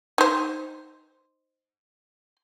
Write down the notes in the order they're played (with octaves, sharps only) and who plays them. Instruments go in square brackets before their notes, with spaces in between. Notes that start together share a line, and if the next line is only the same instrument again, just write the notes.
[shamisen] D#4 C5